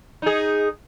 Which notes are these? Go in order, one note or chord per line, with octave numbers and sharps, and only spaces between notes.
D#4 G#4